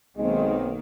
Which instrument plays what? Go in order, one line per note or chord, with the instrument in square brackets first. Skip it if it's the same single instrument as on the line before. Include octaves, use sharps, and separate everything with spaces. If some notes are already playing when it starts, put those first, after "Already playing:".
[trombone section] B1 [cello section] D#3 A#3 [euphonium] G#3 [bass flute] C4